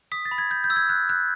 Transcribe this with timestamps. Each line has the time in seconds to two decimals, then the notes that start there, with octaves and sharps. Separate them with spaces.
0.12 D#6 B6
0.25 A6
0.31 B5
0.38 G#6
0.51 G6 G#6
0.64 G6
0.70 E6
0.76 G#6
0.89 F#6
1.09 F#6